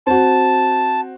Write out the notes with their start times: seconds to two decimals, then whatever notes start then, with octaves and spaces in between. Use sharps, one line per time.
0.07 C4 F#4 A5